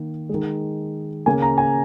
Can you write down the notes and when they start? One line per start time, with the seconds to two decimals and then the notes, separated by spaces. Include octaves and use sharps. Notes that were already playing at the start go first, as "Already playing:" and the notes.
Already playing: D#3 A#3
0.29 D#3 G#3
1.26 C#3 A#3 G#5
1.42 A#5
1.58 G#5